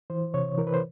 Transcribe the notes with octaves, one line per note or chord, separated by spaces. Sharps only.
E3 C5
C3 C#5
E3 A#4
B4
C5